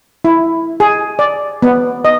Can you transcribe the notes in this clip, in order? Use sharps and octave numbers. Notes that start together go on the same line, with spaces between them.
E4
G#4
D5
B3
D#5